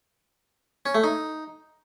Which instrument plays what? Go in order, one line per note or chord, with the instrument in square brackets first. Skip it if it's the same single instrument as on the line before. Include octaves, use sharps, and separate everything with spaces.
[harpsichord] C#4
A3
D#4